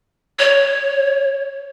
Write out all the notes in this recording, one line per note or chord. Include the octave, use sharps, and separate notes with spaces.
C#5